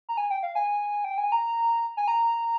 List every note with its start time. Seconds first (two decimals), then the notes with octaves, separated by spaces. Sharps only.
0.09 A#5
0.17 G#5
0.30 G5
0.43 F5
0.55 G#5
1.04 G5
1.18 G#5
1.32 A#5
1.97 G#5
2.08 A#5